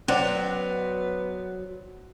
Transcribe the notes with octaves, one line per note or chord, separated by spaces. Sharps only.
F#3 B3 C#4 C5 D5 F#5